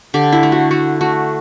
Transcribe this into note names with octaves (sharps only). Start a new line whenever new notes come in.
D3 G4
E4
A3
F#4
A3 F#4
A3 F#4